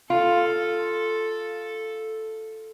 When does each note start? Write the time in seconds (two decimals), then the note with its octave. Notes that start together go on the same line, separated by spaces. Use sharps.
0.10 F4 A4